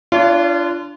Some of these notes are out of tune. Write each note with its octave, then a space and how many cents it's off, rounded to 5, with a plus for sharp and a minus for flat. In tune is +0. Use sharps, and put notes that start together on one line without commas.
D4 +0 F4 -30 C#5 +40